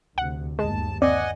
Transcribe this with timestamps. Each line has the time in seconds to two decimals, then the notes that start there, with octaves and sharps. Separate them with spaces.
0.18 D2 C3 F#5
0.59 G1 D#2 G#3 A5
1.02 C4 D5 D#5 F#5 G#5